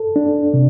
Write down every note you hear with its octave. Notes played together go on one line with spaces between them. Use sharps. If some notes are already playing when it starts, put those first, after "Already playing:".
Already playing: A4
D4
C3